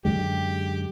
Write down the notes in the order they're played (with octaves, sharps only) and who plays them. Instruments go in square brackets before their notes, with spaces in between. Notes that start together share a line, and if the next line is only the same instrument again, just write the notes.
[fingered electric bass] F#2 D3 G#3 [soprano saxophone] G4